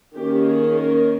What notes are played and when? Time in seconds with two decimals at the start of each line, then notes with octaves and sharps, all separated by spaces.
0.16 D#3 A#3 C#4 G4
0.46 G#4
0.77 A#4